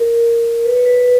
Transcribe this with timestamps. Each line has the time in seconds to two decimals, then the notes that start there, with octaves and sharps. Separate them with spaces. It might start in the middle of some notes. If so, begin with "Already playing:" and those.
Already playing: A#4
0.64 B4
0.75 C#5
0.86 B4
0.96 C#5